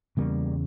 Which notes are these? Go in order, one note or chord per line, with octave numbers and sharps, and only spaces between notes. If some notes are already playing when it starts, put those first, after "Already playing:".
E2 C#3 G3 A#3